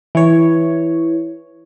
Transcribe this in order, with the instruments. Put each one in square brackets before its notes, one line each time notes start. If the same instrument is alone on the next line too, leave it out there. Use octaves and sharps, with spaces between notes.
[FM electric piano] E3 C#5